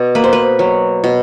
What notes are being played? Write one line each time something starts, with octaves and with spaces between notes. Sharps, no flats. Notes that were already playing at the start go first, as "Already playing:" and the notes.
Already playing: B2 D5
A#3 B4
C5
B4
F#3
B2